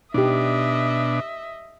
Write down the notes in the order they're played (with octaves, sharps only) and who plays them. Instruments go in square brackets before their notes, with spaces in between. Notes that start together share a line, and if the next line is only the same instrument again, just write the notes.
[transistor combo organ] B2 D4 [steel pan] D#4 G4 [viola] D#5 E5